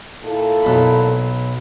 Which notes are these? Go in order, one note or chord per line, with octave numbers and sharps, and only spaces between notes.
A#2 E4 A4
B1 B5